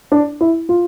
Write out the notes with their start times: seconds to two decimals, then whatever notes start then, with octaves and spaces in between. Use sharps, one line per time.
0.12 D4
0.41 E4
0.69 F4